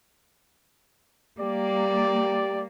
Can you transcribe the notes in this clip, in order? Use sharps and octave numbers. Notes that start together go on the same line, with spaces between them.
G3 A#3 G4 D5